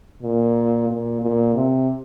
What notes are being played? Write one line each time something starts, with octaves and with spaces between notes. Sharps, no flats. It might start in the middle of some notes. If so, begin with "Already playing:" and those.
A#2
A#2
A#2
C3